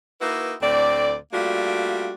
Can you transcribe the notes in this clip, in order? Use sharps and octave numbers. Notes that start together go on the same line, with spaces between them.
A#3 D#4 E4 F#4 B4
D2 A2 C4 D5
G3 A3 A#3 D4 F4 F#4